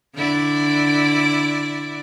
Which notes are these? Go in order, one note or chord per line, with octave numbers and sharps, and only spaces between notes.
D3 E4 D5